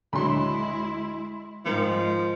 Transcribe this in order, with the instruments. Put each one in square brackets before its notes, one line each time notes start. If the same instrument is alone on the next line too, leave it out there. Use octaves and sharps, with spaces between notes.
[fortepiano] D2 D3 F#3 [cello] G#3 E4 [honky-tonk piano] B5 C6
[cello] G#2 G#3 [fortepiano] D#3 A#4 [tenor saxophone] F3